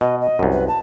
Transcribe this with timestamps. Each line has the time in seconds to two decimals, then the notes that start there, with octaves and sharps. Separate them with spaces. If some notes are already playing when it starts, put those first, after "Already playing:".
0.01 B2 D#5
0.21 D#5
0.39 C2 F#2
0.52 B4
0.68 A5